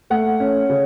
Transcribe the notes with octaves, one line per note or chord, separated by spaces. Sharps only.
A3 F#5
C#4
C#3